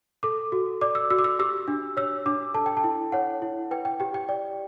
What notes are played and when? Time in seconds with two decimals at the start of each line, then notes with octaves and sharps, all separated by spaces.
0.23 A4 D6
0.52 F#4
0.81 D5 D6
0.95 E6
1.10 F#4 E6
1.19 D6
1.24 E6
1.39 G4 E6
1.68 D4
1.97 C#5 E6
2.26 D4 D6
2.54 A4 A5
2.66 G5
2.77 A5
2.84 E4
3.12 C#5 F#5
3.42 E4
3.71 B4 G5
3.85 G5
4.00 G4 G5
4.14 G5
4.29 D5